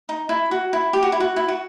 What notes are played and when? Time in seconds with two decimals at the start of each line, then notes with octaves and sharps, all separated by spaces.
0.09 D#4
0.29 E4
0.51 F#4
0.73 E4
0.93 G4
1.03 F#4
1.12 E4
1.20 F#4
1.36 E4
1.48 F#4